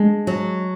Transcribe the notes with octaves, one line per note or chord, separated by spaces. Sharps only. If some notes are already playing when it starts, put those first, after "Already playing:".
Already playing: G#3 D4
F#3